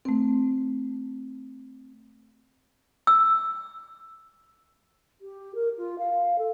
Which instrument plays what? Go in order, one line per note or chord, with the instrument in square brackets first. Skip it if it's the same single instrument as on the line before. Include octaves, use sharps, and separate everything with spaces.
[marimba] A3 C4
[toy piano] E6
[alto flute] G4
A#4
F4
F5
A4